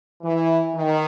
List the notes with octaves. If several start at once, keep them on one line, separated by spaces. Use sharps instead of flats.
E3
D#3